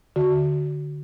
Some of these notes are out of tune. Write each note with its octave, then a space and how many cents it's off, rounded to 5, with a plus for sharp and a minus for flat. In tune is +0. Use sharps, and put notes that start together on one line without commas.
D3 +0 F#4 +0